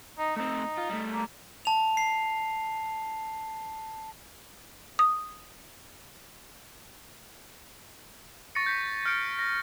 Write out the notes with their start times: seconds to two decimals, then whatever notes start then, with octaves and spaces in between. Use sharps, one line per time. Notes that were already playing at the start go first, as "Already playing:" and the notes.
0.18 D#4
0.36 A3 C4 D#4
0.77 F4
0.89 G3 A3
1.13 A#3
1.65 A5 F7
1.97 C7
4.99 D#6
8.55 C#6 A6 A#6 C#7
8.66 G6 B6
9.05 F6 G6 A6 C#7 D7
9.39 A#6